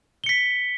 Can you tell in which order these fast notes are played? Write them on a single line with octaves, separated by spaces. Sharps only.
G7 C#7 B6